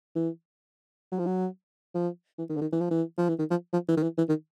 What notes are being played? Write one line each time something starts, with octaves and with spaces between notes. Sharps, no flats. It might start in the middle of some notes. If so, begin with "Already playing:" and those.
E3
F#3
F3
F#3
F3
E3
D#3
D3
D#3
E3
F3
E3
F3
E3
D#3
F3
F3
E3
D#3
E3
E3
D#3